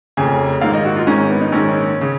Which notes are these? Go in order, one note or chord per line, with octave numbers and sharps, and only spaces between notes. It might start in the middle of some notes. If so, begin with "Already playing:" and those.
F1 F2 C#3 G#5
A#1 G#2 D#3 F5
D#5
F#4
F4
G#1 G#2 D#3 C#4
B3
D#4
A#1 G#2 D#3 C#4
C#3